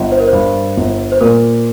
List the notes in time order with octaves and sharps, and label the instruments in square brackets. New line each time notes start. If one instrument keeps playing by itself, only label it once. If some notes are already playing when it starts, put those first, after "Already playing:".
Already playing: [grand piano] G1 [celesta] D#5 G5
[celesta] C5
A#4
[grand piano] G2 [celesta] C5
[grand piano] G1
[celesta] C5
[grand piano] A#2 [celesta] A#4